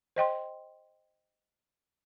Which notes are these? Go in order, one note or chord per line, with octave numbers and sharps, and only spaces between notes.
C5 D#5 G5 C6